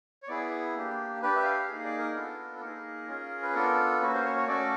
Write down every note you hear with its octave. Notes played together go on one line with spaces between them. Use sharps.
C#5
B3 E4 G#4 D5
A#3 D4 G4
D4 G4 B4
E5
F5
A#3 D#4 G#4 F5
D5
A#4
B3 D4 F4 A4
A#3 D#4 G#4 A#4
C#4 F4 G#4
B4
B3 D4 F4 A4 A#4
A#3 C#4 F#4 B4
C5
C#5
C#5
A3 C#4 F#4 A4 D5